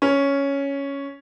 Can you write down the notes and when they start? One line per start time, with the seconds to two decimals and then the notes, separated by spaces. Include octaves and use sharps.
0.02 C#4